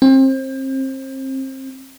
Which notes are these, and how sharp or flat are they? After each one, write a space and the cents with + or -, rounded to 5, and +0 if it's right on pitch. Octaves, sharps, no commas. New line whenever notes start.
C4 +30